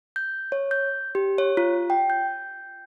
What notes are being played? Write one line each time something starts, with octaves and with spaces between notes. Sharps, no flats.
G6
C#5
G6
G4
C#5
F4
G5
G6